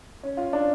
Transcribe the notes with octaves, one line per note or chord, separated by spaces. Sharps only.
C#4
F4
D4